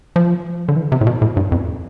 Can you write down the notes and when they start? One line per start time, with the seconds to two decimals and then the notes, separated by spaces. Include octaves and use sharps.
0.16 F3
0.68 D3
0.76 E3
0.92 C3
1.01 A2
1.07 B2
1.22 A2
1.37 G2
1.52 F2